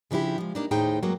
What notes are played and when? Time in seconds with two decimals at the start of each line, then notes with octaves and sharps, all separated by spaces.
0.11 C#3 F3 D4 E4 G4
0.38 F3 G#3
0.55 A#3 D4 D#4
0.71 D#2 A2 D#4 G#4 C5 G5
1.02 G2 F#3 G#3 A#3